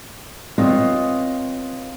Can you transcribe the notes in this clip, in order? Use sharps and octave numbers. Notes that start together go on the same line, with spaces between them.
C4 F4 B4 C#5 D#5 F5